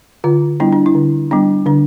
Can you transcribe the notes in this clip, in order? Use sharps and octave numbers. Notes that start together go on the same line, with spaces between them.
D3 F4
G3 B3 D4 E4
D4
E4
D3
G3 B3 D4
D3 D4